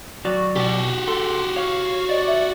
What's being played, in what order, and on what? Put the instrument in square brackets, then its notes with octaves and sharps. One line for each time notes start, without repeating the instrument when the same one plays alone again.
[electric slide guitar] F#3 D5 [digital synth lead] F#4
[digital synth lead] B2 [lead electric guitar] F#4 G4
[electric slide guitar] A4 [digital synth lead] C6
[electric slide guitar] C#5 [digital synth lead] F5
[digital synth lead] D5 [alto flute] D#5
[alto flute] E5